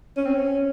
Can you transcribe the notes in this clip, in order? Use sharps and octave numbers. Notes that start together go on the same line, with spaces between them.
C#4
C4
C#4